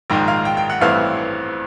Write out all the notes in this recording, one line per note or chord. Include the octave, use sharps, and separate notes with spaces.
A#1 G#2 D#3 G#3 G5
F5
G5
G5
F#5
A1 G2 E3 A3 C4 F5